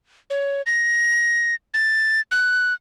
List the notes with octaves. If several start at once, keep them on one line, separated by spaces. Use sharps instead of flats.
C#5
A#6
A6
F#6